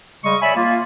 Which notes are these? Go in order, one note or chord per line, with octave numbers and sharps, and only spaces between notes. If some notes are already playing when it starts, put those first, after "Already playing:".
C#3 G3 G#3 D#5 C#6
C#5 D5 E5 G#5 B5
A#3 F4